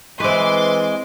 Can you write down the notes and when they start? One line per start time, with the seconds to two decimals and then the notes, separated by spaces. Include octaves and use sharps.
0.20 E3 G#3 C4 B4 C6 D6